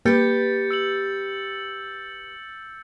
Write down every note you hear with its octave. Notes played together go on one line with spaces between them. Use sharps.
A#3 G4 B4 G6 A6 C#7
E6 C#7 F#7